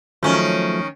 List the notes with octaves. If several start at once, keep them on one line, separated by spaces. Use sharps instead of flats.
D#3 F3 F#3 A3 C#4